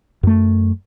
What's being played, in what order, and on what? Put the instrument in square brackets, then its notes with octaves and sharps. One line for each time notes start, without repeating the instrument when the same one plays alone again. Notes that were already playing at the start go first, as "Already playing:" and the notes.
[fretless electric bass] F#2 A3